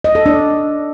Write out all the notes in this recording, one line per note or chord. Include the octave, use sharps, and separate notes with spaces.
D#5
A4
D4